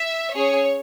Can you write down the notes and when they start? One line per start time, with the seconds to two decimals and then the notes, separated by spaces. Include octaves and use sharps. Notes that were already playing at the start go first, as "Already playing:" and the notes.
Already playing: E5
0.34 C#4 G#4 C#5